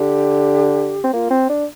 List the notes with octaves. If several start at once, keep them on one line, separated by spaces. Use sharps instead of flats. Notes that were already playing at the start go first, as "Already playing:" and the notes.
Already playing: D3 G4
C4
A#3 F4
C4
D4